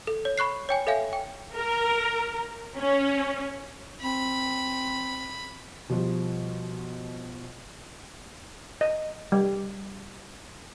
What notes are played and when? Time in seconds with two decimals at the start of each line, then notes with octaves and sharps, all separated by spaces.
0.07 A4
0.25 C#5
0.38 B5 C#6 F#6 C7
0.69 C#5 G5 G#5
0.87 A4 C#5 E5 F5 G#5
1.13 G5
1.56 A#4
2.78 C#4
4.01 C4 B5
5.89 B2 F3 G3
8.81 D#5
9.32 G3